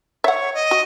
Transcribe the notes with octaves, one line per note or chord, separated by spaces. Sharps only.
C#5 E5 F#5
D#5
F#4